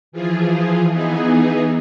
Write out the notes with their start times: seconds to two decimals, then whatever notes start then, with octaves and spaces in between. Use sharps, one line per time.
0.12 E3 F3 F4 G#4
0.90 E3 B3 D#4 G#4